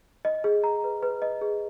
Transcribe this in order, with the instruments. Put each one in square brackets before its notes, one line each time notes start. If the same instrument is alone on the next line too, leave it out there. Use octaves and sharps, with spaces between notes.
[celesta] D#5
G#4
A#5
B4
B4
D#5
G#4